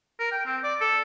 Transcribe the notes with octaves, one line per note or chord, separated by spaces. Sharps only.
A#4
G5
C4
D5
A4